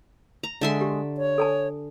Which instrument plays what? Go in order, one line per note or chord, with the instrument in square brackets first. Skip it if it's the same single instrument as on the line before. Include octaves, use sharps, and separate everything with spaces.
[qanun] A#5
[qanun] D3 E5 C6 [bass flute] G#3
[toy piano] G4
[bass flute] C#5
[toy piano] A4 G#5 A5